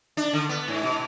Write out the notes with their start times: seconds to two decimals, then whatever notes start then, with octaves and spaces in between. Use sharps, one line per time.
0.17 D4
0.33 D3
0.49 B3
0.68 G#2
0.83 B2